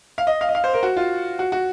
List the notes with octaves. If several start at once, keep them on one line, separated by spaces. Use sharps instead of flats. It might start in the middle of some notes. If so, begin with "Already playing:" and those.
F5
D#5
F5
D#5
F5
C5
A#4
F#4
F4
F#4
F#4